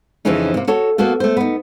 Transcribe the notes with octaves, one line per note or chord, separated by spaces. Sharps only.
F2 C#3 E3 C4 C#4 D#4
C3 A#3
F#4 A4 C#5
A#3 B3 F#4 A4
A3 C5
B3 D#4